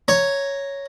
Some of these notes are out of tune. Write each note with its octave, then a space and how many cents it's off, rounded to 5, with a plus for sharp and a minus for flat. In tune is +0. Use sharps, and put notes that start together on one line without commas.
C#5 +0 A#5 +0